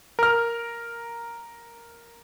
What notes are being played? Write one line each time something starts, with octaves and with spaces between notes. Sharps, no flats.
A#4 F6